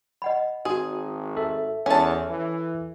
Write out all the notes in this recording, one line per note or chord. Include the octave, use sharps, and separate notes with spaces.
D#5 F#5 B5
G#1 F#4 G#4 C6 D#6
A4 E5
E2 C#4 A5
E3